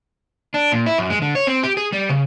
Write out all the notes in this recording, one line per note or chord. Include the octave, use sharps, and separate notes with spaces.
D4
A#2
E4
F#2
G#3
D3
C#5
C4
G4
G#4
G3
C#3